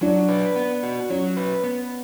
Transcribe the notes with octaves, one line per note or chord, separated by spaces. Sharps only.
F#3 D4
B4
B3
F#4
F#3 C#4
B4
B3